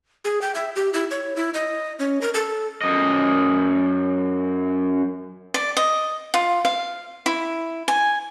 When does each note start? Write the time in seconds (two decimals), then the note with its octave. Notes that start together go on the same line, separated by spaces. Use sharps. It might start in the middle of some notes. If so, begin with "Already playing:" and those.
0.25 G#4
0.42 G5
0.55 E5
0.75 G4
0.94 E4
1.11 C#5
1.36 E4
1.54 D#5
1.99 C#4
2.21 A#4
2.34 A4
2.82 F#2 D#5
5.54 D5
5.77 D#5
6.34 F4
6.65 F5
7.26 E4
7.88 G#5